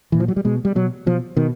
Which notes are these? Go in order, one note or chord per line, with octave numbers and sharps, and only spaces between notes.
A#2 E3
F3
F#3
G3
B2 G#3
G3
B2 F#3
B2 F3
B2 D#3